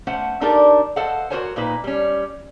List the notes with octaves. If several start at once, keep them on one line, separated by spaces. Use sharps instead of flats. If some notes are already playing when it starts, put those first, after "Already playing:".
A3 C#4 C5 F#5
D4 D#4 G4 A4 A#4 D5
A4 C5 D#5 F5 F#5
F#4 G4 A#4 C5 C#5 G#5
A#2 A#3 D#4 B4
G3 C#4